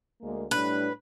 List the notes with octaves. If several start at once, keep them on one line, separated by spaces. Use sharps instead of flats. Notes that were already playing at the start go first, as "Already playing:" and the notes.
D2 G#3 A#3
A2 G3 D4 B4